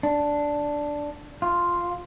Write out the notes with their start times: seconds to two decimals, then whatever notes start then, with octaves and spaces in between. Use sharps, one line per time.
0.03 D4
1.42 F4